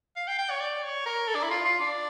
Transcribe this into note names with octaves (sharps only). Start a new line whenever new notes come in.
F5
G5
G5
C#5
D5
C#5
A#4
A4
D4
E4
F4
F4
D4